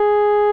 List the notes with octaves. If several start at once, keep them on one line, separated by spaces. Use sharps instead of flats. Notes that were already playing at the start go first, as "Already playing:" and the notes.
Already playing: G#4